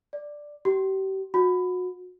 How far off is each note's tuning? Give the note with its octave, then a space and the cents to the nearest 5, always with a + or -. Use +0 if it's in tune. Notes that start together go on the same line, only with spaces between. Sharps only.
D5 +5
G4 -35
F#4 -30